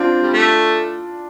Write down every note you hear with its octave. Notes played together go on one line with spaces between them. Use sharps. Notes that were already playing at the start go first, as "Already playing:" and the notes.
Already playing: C4 D4 F4
G3
A3